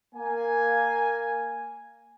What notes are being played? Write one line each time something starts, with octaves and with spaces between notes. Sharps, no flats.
A#3 G#5